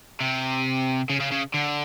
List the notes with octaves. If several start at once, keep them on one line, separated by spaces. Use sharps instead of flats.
C3
C#3
C#3
C#3
D3